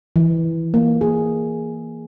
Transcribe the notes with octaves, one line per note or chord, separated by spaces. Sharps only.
E3
A#3
G#4